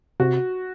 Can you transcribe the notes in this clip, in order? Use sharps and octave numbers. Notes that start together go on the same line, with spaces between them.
C3 F#4